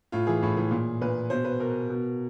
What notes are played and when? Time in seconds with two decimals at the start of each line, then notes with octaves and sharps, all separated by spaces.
0.12 A2 F4
0.27 E3 G#4
0.43 A2
0.57 E3
0.71 A#2
1.02 A#2 B4
1.30 B2 C5
1.45 B4
1.60 B2 A#4
1.90 B2